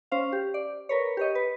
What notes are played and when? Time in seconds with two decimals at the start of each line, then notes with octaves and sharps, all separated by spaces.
0.12 C#4 C5 F5
0.33 G4
0.54 D5
0.89 A#4 B4 C#5
1.17 G4 C#5 D#5
1.35 B4